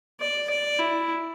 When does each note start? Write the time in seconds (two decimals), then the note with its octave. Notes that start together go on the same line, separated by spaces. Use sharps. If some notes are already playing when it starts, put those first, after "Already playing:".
0.20 D5
0.50 D5
0.79 E4